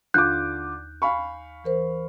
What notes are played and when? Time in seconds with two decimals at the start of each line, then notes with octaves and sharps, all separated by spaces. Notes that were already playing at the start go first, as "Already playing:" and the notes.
0.14 D#2 D3 F4 D6 F#6 G6
1.02 F5 G#5 B5 C#6
1.64 E3 A#4 C5